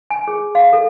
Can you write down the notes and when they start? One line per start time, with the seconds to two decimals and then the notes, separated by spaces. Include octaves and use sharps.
0.10 G#5
0.28 G#4
0.55 F5
0.73 A4